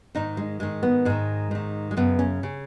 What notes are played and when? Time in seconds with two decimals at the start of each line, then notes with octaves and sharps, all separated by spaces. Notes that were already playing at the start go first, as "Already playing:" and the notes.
0.15 G#2 D#3 D#4
0.37 G#3
0.60 G#2 D#3 G#3
0.83 B3
1.05 G#2 D#3 G#3
1.51 G#2 D#3
1.91 G#3
1.97 F#2 C#3 B3
2.19 C#4
2.43 C#3